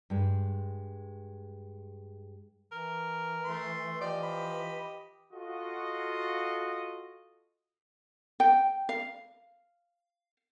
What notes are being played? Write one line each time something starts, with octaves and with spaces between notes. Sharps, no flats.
G2 G#3
E3 A#4
A3 C6
E3 F3 G4 D5 D#5
B5
F4 F#4 A4 D#5
G5
F5